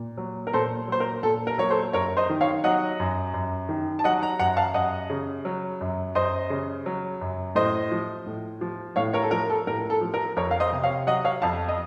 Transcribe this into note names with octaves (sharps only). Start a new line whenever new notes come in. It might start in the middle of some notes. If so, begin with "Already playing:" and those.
Already playing: A#2
F#3
A#4
A#2 A4 C5
F#3 C5
A#4
A#2 A4
A#4
F#3 C#5
A4 C5
F#2 A#4 C#5
C5 D#5
D#3
C#5 F5
F#3 D#5 F#5
F#2
F#2
D#3
A5
F#3 D#5 F#5
F#5 A#5
F#2 F#5 A#5
F5 A5
F#2 D#5 F#5
C#3
F#3
F#2
F#2 C5 D#5
C#3
F#3
F#2
A2 C5 D#5
F3
A2
F3
A2 C#5 F5
A#4 C#5
A4
F3 A#4
A4
A2 A#4
A4
F3
A#4
F2 A#4 C#5
F5
C5 D#5
C3
C#5 F5
F#3 D#5 F#5
C#5 F5
F2 F5 A5
D#5